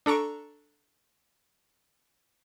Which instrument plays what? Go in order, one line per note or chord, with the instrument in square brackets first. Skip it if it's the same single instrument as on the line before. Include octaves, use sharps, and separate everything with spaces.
[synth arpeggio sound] D4 A4 A#5 C#6 D7